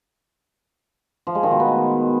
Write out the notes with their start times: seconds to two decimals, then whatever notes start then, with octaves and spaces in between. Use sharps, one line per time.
1.27 F3
1.35 G#3
1.43 D#3
1.51 B2
1.60 B3